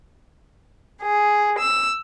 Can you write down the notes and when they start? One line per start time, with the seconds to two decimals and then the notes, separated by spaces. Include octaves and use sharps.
1.03 G#4
1.59 E6